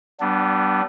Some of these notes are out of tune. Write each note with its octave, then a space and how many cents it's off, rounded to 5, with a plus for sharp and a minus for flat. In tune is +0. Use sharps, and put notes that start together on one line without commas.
G3 -35 B3 -5 D4 +0